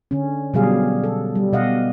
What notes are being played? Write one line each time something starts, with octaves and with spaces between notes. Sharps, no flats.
D3 C#4
B2 D3 F#3 G3 G#4 F5
A4
G3
B2 D#5 F5 F#5